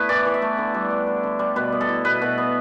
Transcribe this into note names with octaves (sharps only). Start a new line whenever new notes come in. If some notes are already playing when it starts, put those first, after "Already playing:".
Already playing: A3 B3 D4 E4 B4
E3 D5
E3
E5
A3
D3
G3
D4
D3
D3
G3
B2 B4
B3
A4
E4
B2 B4
B2
B3